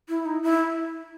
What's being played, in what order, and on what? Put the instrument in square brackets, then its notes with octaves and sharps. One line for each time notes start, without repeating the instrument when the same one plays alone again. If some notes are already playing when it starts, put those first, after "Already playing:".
[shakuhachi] E4
D#4
E4